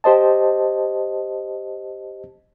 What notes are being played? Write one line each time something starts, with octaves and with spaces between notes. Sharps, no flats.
G4 C5 D#5 A5